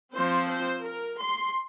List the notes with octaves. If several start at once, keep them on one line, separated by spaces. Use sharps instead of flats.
F3 C4 C5
C5
A#4
C6